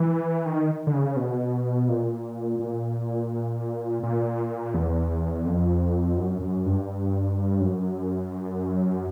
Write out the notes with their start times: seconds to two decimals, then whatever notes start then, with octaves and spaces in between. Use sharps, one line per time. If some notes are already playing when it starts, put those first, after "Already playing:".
Already playing: E3
0.46 D#3
0.87 D3
0.93 C#3
1.16 B2
1.89 A#2
2.59 A#2
4.03 A#2
4.74 E2
5.46 F2
6.17 F#2
6.42 F#2
6.66 G2
7.60 F#2